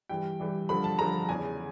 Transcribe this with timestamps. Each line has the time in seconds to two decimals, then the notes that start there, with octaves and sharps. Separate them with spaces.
0.09 G2 E3 G3 G5
0.40 G2 E3 G3
0.69 G2 D3 F3 B5
0.84 A5
0.99 G2 D3 F3 A#5
1.29 E2 C#3 E3 G#5